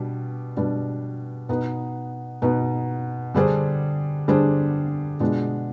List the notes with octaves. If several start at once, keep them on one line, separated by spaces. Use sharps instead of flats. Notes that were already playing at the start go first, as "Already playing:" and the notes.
Already playing: B2 G3 D4
B2 G3 D4
B2 B3 D#4 B4
B2 B3 D#4 B4
D3 G3 D4 G#4 C5
D3 G3 D4 G#4 C5
B2 G#3 B3 D4 F4